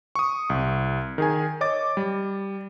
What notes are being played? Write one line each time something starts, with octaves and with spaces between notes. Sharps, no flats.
C#6 D#6
C2
D#3 G#4 G#5
C#5 D#5 D6 A6
G3